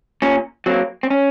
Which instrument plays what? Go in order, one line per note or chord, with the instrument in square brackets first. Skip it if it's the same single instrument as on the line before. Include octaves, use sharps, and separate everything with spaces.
[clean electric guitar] A#2 C#4
F#3 A#3 C4
C4
C#4